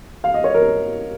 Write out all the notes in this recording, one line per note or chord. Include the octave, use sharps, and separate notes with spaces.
F5
D#5
C#5
A#4